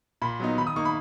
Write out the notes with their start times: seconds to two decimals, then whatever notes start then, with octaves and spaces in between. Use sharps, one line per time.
0.22 A#2 B5
0.40 F#3 B3 D#4
0.58 D#3 B5
0.67 D#6
0.76 A#3 D#4 C#6
0.85 B5